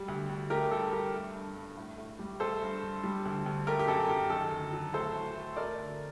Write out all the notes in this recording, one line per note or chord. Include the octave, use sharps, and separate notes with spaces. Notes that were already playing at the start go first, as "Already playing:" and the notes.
Already playing: G3
D2
D2
A3 G4 A#4
G2 A4
G2 G4 A#4
A3
G2
G2
A2
A2
G3
A3 A4 C5
G2
G2
G3
D2
D2
A3 G4 A#4
G4
F#2 A4
F#2 G4
D#3 A4
D2
F#3
A2 A4 C5
A2
A3
A3 A#4 D5
D2